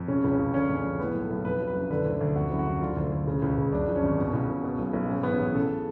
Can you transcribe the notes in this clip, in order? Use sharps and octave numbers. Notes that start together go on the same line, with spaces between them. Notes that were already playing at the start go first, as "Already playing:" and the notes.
Already playing: F2
C#3 C#4
C#2
C#4
C#2
D3 C#4
F2
C#4
F2
A2 B3
B1
A4
B1
F2 B4
F#3
B4
F#1
D3 B4
D2
D2
F2 F#4
F#1
F#4
F#1
D3 F4
D2
D2
C#3
C#2
C#2
F#2 D4
F3
C#4
G#1
B2
C#2
C#2
B2
B1
B1
G#2 C#4
A1 B3
C#4
A1
C#3 A4